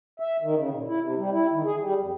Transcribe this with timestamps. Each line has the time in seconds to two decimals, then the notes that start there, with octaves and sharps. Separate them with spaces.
0.20 E5
0.42 D#3
0.56 C#3
0.74 A#2
0.87 E4
1.01 C3
1.17 G3
1.32 E4
1.52 D#3
1.65 G#4
1.81 G3
2.01 F2